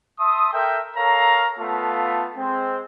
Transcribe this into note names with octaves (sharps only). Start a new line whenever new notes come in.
E5 A5 C6 D#6
A4 A#4 E5 G5
A4 A#4 C#5 F5 A#5
A3 B3 F4 F5 A5
G#3 C4